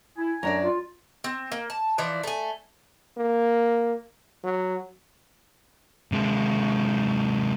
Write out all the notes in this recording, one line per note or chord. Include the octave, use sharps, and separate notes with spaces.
E4 G#5
F#2 D4 D5 A#5
F4
C4
A#3
A5
E3 F3 D5
A3 G#5
A#3
F#3
C3 G#3